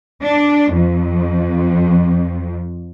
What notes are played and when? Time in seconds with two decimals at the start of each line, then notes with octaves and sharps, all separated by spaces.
0.23 D4
0.72 F2